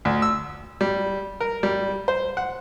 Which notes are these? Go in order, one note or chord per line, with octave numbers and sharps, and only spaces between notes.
D2
E6
G3
A#4
G3
C5
F#5